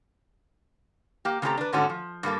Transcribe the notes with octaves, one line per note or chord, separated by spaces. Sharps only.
A#3 G4
C#3 A3 C4 G4 A4 A#5
D4 B4
G#2 D3 A3 C#4 F#4 A4
F3
G2 G3 A#3 A4